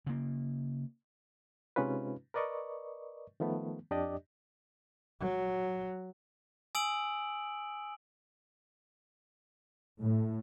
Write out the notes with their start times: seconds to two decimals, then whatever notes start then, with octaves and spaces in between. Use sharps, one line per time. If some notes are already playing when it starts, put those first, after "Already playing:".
0.06 C#3 A#3
1.76 C3 G#3 C#4 D#4 F4 B4
2.34 A#4 B4 D5 D#5 C#6
3.40 D#3 F3 A3 B3
3.91 F2 D4 G4 D5 D#5
5.20 F#3
6.75 G#5 D#6 E6 D7 F#7
10.00 A2